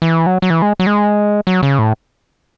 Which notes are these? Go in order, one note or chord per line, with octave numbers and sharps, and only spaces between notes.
E3
F#3
F#3
E3
G#3
F#3
G#3
F#3
C#3
A2